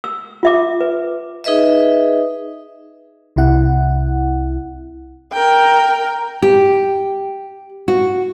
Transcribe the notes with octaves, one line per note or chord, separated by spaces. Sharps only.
E6
F4 E5 D6
B4
D#4 G#4 B4 D#5 E5
C2 C3 E4 F#5
A#4 G5
G4
F#4